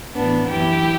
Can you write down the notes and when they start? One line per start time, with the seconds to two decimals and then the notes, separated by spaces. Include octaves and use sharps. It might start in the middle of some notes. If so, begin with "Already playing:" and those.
0.15 A2 E3 B3 D4
0.48 F#2 E3 E4 G4